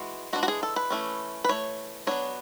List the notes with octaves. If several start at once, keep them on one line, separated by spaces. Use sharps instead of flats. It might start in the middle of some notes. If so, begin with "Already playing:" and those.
Already playing: E3 G#3 F#4
E3 G#3 D4 F#4
F#4
G#4
A4
B4
E3 A3 C#4
B4
E3 A3 C#5
F#3 B3 D4 C#5